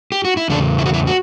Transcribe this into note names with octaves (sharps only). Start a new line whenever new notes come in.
G4
F#4
E4
E2 C#3 D4
E4
F#4
E4
F#4